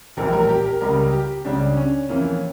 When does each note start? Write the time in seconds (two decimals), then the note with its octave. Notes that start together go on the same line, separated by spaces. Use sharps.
0.17 A#1 A2 E3 G3 A#4
0.33 A#4
0.49 G4
0.65 A#4
0.81 C#2 C#3 G3 A#4
1.13 G4
1.45 C#2 C#3 G3 C#4 D4
1.77 C#4
2.09 F2 E3 A#3 C#4